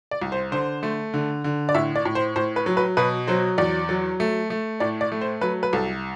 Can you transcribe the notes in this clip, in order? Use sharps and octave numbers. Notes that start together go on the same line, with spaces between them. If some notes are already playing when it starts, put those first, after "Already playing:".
D5
C2
C5
D3 C5
A3
D3
D3
D5
A2 E5
D5
A2
C5
A2 C5
B4
F#3
B4
B2 B4
F#3 C5
E2 D5
F#3
A3
A3
A2 D5
D5
A3
C5
F#3 B4
B4
C2 A4